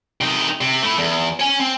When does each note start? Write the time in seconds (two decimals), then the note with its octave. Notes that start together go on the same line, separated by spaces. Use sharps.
0.21 C3 D#4
0.61 C3
0.82 A3 E4
0.98 E2
1.40 C#5 G#5
1.60 C4